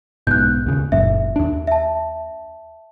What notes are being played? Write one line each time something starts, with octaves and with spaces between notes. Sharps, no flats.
B1 G#2 B2 F#6 G6
D#2 C#3
F#1 F#2 A#2 E5
D#2 D4
E5 A5